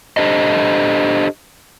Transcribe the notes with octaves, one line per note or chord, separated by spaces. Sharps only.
D4 G4 A4 C5 D#5